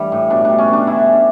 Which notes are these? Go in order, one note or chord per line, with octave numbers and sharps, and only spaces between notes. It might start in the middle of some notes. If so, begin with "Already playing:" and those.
Already playing: E3 G3 A3 C#4 D4 E4
A2
B2 D4
G3 D4
C#4
B2
D4
D3 E4
C#4